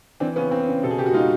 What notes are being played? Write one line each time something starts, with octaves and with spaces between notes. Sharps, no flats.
E3 C4 D4
C#3 B3 C#4
C#3 C4
C#3
B2 A4
G#4
B2 G4
F#4
G#3 D#4 F4